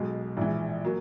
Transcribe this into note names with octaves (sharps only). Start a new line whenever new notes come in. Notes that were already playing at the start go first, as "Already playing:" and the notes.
Already playing: B1 B2 G#3
A#1 G#2 E3
F#3 A#3